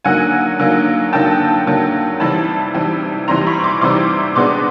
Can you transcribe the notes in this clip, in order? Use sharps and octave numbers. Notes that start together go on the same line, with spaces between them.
D3 F#3 A#3 D#4 F#5 G#5
D3 F#3 A#3 D#4
D3 F#3 A#3 D#4 G5 A5
D3 F#3 A#3 D#4
C3 E3 G3 C4 D#4 A5 B5
C3 E3 G3 C4 D#4
C3 E3 G3 C4 D#4 A#5 C6
B5 C#6
C6 D6
C3 E3 G3 C4 D#4 C6 D6
B2 G#3 B3 D4 C6 D6